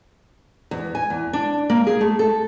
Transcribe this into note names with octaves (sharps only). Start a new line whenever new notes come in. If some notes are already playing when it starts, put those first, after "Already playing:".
E2
G#5
E2
D4
A#3
G#4
A3
A4